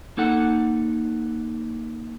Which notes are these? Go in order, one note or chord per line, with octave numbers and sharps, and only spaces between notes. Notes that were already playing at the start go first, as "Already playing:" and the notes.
A#3 D#4 A4 F#5